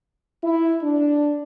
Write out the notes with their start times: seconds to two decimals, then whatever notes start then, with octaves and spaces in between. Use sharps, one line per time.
0.42 E4
0.82 D4